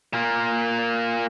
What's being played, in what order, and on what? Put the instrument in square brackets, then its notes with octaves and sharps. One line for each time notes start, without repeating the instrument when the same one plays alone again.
[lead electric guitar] A#2 A#3